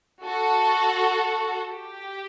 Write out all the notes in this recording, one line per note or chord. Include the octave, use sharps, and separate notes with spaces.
F#4 A4
G4